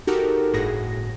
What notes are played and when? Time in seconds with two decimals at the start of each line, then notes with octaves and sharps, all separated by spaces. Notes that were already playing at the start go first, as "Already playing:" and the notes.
0.07 D#4 F#4 G4 A4 A#4
0.53 G1 A2 F#4 G#4 A#6